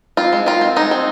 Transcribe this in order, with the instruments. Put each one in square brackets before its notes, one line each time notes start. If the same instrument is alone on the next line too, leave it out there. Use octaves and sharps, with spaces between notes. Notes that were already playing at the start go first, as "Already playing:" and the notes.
[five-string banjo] C4 F4
G#3
D#3 F4
C4
G#3 D#4
C4